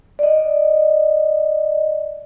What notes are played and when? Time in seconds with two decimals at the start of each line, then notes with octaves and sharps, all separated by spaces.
0.19 D5 D#5